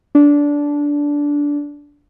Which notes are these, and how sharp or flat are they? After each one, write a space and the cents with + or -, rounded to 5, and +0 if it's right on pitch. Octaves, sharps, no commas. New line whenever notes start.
D4 -15